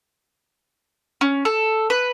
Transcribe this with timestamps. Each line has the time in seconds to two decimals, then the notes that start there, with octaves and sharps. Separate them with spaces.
1.21 C#4
1.45 A4
1.90 B4